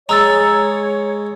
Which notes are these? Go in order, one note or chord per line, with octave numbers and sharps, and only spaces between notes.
G#3 C#5 A#5 E6 A6